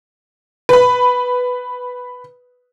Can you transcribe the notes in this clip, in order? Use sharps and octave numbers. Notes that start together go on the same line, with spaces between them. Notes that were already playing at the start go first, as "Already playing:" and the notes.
B4 B5